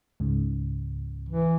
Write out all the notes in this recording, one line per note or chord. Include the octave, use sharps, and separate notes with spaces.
C#2 G#2 C#3
E3